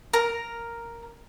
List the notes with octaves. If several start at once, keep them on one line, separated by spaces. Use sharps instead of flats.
A#4 A#5